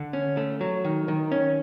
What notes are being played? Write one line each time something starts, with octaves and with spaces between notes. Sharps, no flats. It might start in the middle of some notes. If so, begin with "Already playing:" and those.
Already playing: D3
C#4
A3
F#3
D#3
D#3
C#4